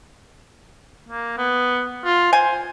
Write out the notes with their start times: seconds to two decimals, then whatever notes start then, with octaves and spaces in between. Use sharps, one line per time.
1.08 A#3
1.37 B3
2.05 F4
2.33 C5 G#5